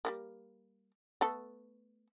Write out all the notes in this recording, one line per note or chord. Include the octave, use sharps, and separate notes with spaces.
G3 A3 A#3
A3 B3 A4